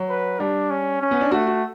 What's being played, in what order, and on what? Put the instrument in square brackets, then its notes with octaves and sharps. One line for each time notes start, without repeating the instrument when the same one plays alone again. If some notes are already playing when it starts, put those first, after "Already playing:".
Already playing: [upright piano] F#3
[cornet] B4
[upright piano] G3 [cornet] D4
[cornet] C#4
C#4
[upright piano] B3
D4
[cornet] A3 [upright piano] F#4
[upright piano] F#4